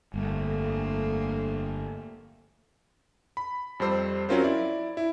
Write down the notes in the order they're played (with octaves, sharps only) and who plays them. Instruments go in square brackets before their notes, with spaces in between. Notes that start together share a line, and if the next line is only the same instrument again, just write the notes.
[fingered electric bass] G1 [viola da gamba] F2 A3 A#3
[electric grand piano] B5
F2 G3 C5 E6 C7
F#3 C4 C#4 F4 A#4 C5
E4 D5
E4